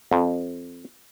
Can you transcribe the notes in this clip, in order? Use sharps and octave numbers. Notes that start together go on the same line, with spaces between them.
F2